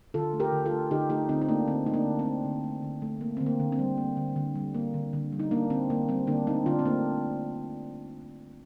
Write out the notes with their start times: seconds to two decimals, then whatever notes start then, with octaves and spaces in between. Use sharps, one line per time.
0.14 D3 F4 A4
0.34 A3
0.40 G4 A#4
0.52 D3
0.65 F4 A4
0.72 A3
0.91 D3 D#4 G4
1.10 A3 D#4 G4
1.29 D3 C4 D#4
1.42 D#4
1.49 A3 A#3 D4
1.68 D3 C4
1.86 A3 D#4
1.94 A#3 D4
2.06 D3
2.19 C4
2.25 A3
2.45 D3
2.64 A3
2.83 D3
3.02 A3
3.21 A#3
3.37 D3 C4
3.46 A#3
3.60 D3
3.72 C4
3.79 G3
3.98 A#3
4.17 D3
4.36 D3
4.55 G3
4.74 A#3
4.94 D3
5.13 D3
5.33 G3
5.40 D#4
5.51 A#3 D4
5.70 D3 C4
5.90 D3 A#3
6.09 G3 C4
6.27 D3 A#3 D4
6.47 A3 C4 D#4
6.66 D3 D4 F4
6.79 C4
6.85 A3 A#3 D4